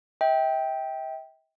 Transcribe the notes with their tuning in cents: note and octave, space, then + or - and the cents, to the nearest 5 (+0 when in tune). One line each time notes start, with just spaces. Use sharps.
E5 -45 G5 +0